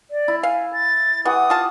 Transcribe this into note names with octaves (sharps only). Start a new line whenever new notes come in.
D5
E4
F5 G#5
A6
E3 G4 F#5 C#6 D#6
F4 A5